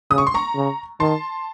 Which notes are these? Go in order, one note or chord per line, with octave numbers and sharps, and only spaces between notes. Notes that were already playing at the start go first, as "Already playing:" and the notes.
C#3 D#6
C#6
C6
A#5 C#6
C#3
D#3 A5 C6